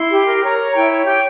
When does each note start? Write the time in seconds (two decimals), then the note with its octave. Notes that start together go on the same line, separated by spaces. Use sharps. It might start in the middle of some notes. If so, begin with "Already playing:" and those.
Already playing: E4 C6
0.09 G4
0.25 A#4
0.42 C#5 A#5
0.58 C#5
0.73 E4 G5
0.90 C#5
1.05 G4 G5